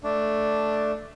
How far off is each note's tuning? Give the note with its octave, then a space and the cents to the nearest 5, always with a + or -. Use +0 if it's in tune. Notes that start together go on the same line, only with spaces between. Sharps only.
A3 +0 D4 +0